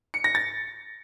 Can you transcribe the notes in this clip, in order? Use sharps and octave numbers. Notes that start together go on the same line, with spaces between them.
C#7
A#6
A6